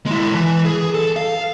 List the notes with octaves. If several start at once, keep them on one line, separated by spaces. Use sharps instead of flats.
G#3 E4
E3
G#4
A4
F5